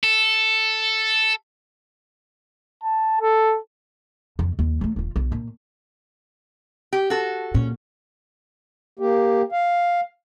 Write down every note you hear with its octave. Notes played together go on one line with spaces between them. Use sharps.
A4
A5
A4
F2
D#2
F#3 A3
D#1 F4
B1
A#2
G4
F#4 A4
A#2 C#4
A#3 G4
F5